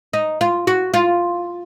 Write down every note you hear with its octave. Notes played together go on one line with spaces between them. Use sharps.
D#4
F4
F#4
F4